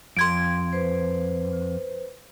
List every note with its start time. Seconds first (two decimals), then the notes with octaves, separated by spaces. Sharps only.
0.17 F2 C6 G#6 D7
0.73 B4 C5